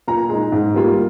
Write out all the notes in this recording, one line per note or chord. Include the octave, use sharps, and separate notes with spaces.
A#2 A#5
G#3 D#4
G#2
G3 A#3 F4